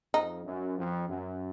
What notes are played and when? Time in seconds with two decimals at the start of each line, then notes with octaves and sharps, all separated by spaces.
0.14 F2 D#4
0.46 F#2
0.77 F2
1.09 F#2